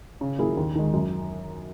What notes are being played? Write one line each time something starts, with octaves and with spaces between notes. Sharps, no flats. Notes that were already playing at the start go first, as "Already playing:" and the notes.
C#3
F#3 A#3 E4 G#4
D#2
D#3 G#3
F#2